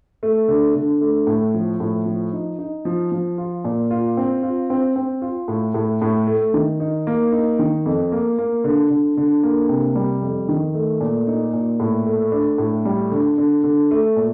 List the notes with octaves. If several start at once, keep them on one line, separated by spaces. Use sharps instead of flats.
A3
D3
D3
A3
A2
F3
A2
F3
D#4
D#4
F3
F3
F4
A#2
F4
C4
F4
C4
C4
F4
A2
A2
A2
A3
D#3
D#4
A#3
D#4
D#3
F2
A#3
A#3
D3
D3
D3
A#3
C3
G3
F2
D#3
A3
A#2
D#4
A#2
A2
A3
D4
A2
G3
D3
D3
D3
A3
A#2